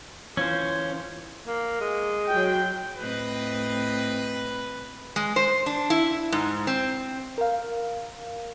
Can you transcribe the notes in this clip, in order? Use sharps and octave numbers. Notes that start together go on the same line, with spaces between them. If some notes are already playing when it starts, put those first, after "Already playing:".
E3 C#4 F4 C5
A#3
G#3
F#3 F#4 G5
A2 C4 B4 D#5
G#3
C5
D4
E4
G#2
C4
A#4 F5